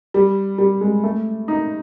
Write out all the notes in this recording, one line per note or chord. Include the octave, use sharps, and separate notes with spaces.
G3
G3
G#3
A3
D#4